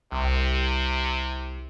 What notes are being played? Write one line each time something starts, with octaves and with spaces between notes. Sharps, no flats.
C2 C3